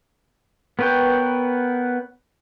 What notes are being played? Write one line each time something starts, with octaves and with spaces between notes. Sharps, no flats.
B3 A#4 B4 C#5 G5